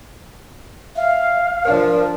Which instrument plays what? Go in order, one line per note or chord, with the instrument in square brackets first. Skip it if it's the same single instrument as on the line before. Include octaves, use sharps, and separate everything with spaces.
[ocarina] E5 [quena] F5
[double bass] F3 D4 [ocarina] A#4